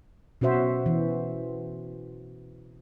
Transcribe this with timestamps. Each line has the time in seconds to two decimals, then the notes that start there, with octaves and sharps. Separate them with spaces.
0.41 B2 C#4 F#4 C5 E5
0.86 E3